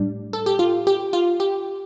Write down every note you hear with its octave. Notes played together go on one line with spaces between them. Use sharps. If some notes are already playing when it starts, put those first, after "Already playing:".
Already playing: A2 G3 D4
A4
G4
F4
G4
F4
G4